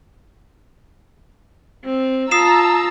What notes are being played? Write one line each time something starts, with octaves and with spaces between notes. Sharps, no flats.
C4
F4 A5 A#5 D#6 E6 C7 E7